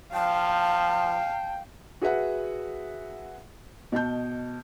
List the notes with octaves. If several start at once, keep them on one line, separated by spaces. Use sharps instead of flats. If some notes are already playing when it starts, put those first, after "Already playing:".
F3 F5 G5 A5
F#4 G#4 B4 E5 F#5
B2 D#5 A5 G6